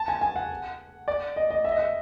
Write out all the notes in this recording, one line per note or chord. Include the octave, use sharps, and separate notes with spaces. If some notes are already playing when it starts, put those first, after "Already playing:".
Already playing: A5
G#5
G#5
F#5
D5
D#5
D#5
E5
D#5
E5